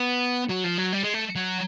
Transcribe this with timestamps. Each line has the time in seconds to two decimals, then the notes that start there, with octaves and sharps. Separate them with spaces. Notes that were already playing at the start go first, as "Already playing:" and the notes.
Already playing: B3
0.49 F#3
0.64 F3
0.78 F#3
0.93 G3
1.03 G#3
1.14 A3
1.36 F#3